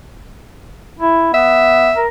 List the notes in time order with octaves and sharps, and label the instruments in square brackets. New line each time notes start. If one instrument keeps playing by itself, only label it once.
[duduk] E4
[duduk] B3 [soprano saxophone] E5
[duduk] A#4